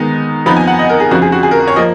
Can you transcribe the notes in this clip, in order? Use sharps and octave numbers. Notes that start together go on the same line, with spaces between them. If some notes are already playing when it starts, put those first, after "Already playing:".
Already playing: D#3 G#3 B3 D#4
F2 F3 B3 D#4 B5
G#5
F#5
D#5
A#4
G#4
F2 C#3 F3 F#4
G#4
F#4
G#4
A#4
C#5
F3 A#3 D#5